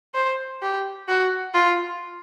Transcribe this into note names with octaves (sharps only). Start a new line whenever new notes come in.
C5
G4
F#4
F4